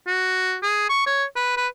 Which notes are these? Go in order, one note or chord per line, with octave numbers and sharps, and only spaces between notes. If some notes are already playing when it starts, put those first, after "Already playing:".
F#4
G#4
C#6
C#5
B4
B4